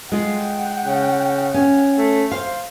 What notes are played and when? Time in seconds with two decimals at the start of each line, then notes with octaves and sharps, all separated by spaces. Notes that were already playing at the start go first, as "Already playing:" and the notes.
0.12 G#3 F4 F#5 G5
0.85 C#3
1.54 C#4
1.98 A3
2.32 C5 F5